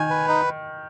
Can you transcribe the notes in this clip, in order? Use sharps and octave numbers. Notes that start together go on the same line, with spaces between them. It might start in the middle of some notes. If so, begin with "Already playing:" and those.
Already playing: D#3 G#5
B4
D#4